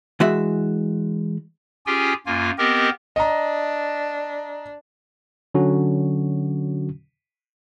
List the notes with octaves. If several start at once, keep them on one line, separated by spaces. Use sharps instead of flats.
E3 G#3 F#4 E5
C#4 F4 G4 G#4 G5 G#5
F#2 A#3 F4 G#5
B3 C4 G4 A#4 D#5
D4 D#5 A#5
D3 F#3 C#4 F#4